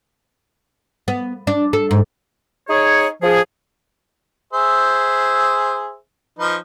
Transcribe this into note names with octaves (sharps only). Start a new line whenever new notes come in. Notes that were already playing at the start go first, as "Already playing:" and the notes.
B3
D4
A4
G#2
D#4 G#4 C#5
F3 G#4
G#4 C5 E5
F3 D#4 B4